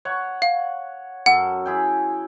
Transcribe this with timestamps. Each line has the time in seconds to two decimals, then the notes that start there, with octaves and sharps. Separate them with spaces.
0.05 C#5 F#5
0.42 F5
1.26 F#2 A4 F#5
1.66 E4 G#4 G5